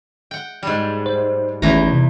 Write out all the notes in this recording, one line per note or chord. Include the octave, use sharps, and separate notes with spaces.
F#5 G5
G#2 G3
C5
G#1 E2 E3 A3 C#4 A#5
C3